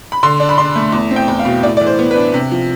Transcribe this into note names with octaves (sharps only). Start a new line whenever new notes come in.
B5
D3 C6
D4
B5
D4 C6
A3
E2
C4
G5
E2
F5
B2
A2 D5
E3 D5
C5
B3
B4
D4
C3
F3